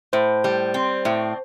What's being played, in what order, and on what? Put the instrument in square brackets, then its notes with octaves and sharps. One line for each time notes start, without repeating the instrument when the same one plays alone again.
[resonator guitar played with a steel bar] A2 [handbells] C5
[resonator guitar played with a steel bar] G3
C4
A2